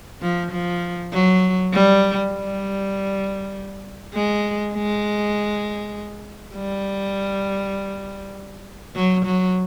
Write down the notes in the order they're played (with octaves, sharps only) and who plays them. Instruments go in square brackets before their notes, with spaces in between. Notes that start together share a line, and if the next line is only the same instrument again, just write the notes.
[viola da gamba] F3
F3
F#3
G3
G3
G#3
G#3
G3
F#3
F#3